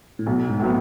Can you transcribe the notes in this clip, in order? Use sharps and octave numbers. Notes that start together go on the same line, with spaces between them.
A2
B1 B2
G#2
A2 F#3 B3